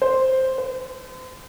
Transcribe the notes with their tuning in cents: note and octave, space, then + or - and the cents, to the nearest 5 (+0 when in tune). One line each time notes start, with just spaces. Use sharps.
C5 +0
C5 -40